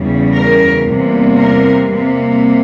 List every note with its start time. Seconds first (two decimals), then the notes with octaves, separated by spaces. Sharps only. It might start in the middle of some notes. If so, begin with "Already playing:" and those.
Already playing: E2 C#3 G3
0.34 A#4
0.85 E2 C3 G3 A#3
1.37 A#4
1.88 C3 G3 A#3